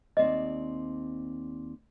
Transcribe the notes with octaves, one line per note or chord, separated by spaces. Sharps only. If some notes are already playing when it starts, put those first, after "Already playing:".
D#2 C4 D5 D#5